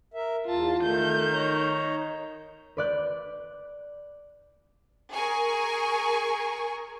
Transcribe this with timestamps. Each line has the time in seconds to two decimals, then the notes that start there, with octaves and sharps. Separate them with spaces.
0.14 A#4 E5
0.46 E2 F4 A5
0.83 D#3 A3 G6
1.32 D#4 C#5 A#5
2.77 B4 D5 F#6 G6
5.12 G#4 A#4 G#5 C#6